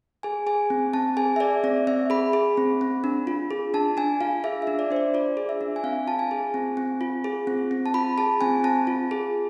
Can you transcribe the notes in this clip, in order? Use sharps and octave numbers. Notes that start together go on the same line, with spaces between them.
G#4 G#5
G#4 G#5
C4
C4 A5
G#4 G#5
E5
G#4 D5
C4 D5
C4 E5
G#4 B5
G#4
C4
C4
D4
F4
G#4
D4 A5
D4 G#5
F4 F5
G#4 E5
E5
D4
D5
D4 C5
D5
F4 D5
G#4
E5
D4
G#5
C4 F5
F4 A5
G#5
G#4
C4
C4
F4
G#4
C4
C4
A5
F4 B5
G#4 A5
C4 G#5
C4 A5
F4
G#4